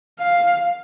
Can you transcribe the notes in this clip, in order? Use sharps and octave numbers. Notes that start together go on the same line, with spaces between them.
F5